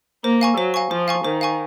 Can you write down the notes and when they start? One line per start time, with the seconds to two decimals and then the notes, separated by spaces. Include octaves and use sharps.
0.24 A#3 C5
0.41 F5 G#5 C#6
0.57 F#3 C5
0.74 F5 G#5 C#6
0.91 F3 C5
1.08 F5 G#5 C#6
1.25 D#3 C5
1.41 F5 G#5 C#6